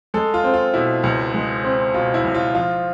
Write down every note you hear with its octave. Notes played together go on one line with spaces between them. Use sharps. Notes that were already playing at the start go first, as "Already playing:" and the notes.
G#3 A4
F4
C4
F4
B2 E4
C#2
G#3
C4
B2 F4
E4
C#2
F4
F3 F4